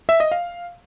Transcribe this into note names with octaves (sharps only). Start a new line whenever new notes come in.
E5
D#5
F5